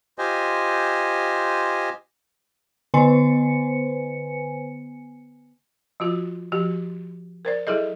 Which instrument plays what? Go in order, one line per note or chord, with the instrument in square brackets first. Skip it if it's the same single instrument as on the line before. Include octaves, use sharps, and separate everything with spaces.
[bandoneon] F4 G4 C5 D#5 G#5
[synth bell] D3 B3 B4 C5 G#5 C#7
[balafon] F3 F4 F#4
F3 F#4 G4
A#4 C5 D5
F#3 E4 G#4 A4 D#5